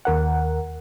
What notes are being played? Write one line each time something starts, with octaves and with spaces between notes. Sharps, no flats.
D#2 A#4 F#5